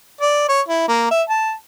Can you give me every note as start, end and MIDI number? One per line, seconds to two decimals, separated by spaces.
0.21 0.44 74
0.48 0.61 73
0.68 0.84 64
0.88 1.06 58
1.11 1.22 76
1.29 1.53 81